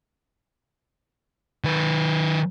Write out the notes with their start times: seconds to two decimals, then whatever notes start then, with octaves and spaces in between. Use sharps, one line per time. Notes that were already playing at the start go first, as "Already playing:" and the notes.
1.64 D#3 B4